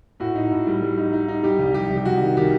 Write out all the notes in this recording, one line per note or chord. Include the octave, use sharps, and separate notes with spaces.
A2 F#4
D#4
A2
G3
G3
D#4
D#4
D#4
G3 G4
C2
C2 G4
C2
G4
C2 F#4
D#3
D#3 G4